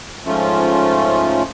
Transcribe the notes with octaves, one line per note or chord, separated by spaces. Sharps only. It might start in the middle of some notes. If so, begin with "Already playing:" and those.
G#2 F3 A3 C#4 F4